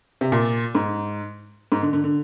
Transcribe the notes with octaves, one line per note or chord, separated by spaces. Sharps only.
C3
A#2
G#2
G#2
D3
D3
D3